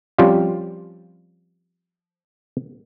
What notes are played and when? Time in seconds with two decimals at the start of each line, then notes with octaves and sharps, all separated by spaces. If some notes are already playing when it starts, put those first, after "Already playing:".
0.18 F3 G3 C4 C#4 F4 G4